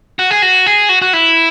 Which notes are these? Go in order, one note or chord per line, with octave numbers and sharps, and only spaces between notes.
F#4
G#4
F#4
G#4
F#4
F#4
E4